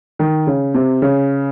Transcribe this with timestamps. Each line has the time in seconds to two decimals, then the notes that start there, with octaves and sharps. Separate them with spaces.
0.19 D#3
0.47 C#3
0.74 C3
1.02 C#3